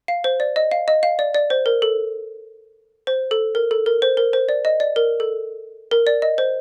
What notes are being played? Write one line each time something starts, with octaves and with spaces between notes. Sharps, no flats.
F5
C5
D5
D#5
F5
D#5
F5
D5
D5
C5
A#4
A4
C5
A4
A#4
A4
A#4
C5
A#4
C5
D5
D#5
D5
A#4
A4
A#4
D5
D#5
C5